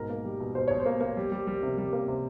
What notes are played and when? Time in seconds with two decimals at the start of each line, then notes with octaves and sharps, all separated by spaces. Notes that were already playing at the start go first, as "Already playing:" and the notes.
Already playing: G#2 B2 A#4
0.10 A#3
0.25 G3
0.40 B2
0.55 B2 C5
0.68 B2 C#5
0.80 C5
0.86 A#3
1.01 A#3
1.17 G3
1.32 G3
1.47 G3
1.63 C3
1.78 G3
1.93 A#3
2.08 C3